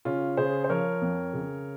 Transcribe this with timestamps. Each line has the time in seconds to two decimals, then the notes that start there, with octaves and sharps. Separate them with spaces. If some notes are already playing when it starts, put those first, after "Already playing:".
0.05 C#3 C#4 F4
0.37 C#3 G#4 C5
0.64 C5
0.69 F3 A#4 C#5
1.02 F2
1.33 C#3